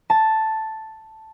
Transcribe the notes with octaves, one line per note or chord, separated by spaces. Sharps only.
A5